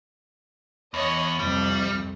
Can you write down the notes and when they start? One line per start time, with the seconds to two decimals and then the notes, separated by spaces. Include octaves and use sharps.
0.94 E2 C#5 D#5
1.39 C2 F2 G3